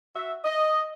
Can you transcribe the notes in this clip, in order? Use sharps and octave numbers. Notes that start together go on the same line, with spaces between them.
F#4 E5
D#5